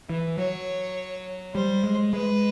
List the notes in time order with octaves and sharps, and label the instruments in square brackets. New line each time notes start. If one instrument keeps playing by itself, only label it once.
[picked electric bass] E3
[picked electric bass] F#3 [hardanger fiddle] C#5
[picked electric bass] G3 [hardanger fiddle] C5
[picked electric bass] G#3
[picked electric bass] G#3 [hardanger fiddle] B4